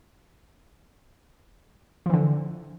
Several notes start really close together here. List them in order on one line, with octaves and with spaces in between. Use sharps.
F3 E3 D3